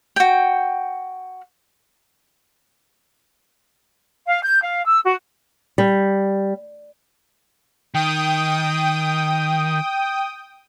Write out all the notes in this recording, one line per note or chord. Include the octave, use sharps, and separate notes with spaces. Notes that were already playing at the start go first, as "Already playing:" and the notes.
F#4 G5
F5
G6
F5
E6
F#4
G3
D#3 G5 D#6